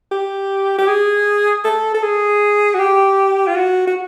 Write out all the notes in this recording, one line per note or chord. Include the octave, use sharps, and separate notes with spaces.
G4
G4
G#4
A4
A4
G#4
F#4
G4
F4
F#4
F#4